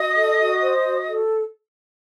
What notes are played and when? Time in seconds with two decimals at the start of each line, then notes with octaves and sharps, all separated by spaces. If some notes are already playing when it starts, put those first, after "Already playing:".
Already playing: F#4 D#5 D#6
0.15 A4
0.39 F#4
0.62 C5
0.85 F#4
1.08 A4